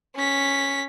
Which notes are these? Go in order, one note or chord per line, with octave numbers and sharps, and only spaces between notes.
C#4 B6